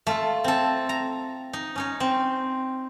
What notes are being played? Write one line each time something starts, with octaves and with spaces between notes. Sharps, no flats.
A3 F4 A4
C4 A4
A#5
D#4
C#4 D#4 C#5
C4